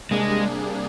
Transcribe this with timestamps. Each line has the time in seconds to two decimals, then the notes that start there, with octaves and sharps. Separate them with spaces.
0.11 C3 G3 G#3 A#3 D4 G#4